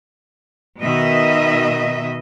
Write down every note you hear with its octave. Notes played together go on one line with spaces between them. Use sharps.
B2 D#3 D#5 E5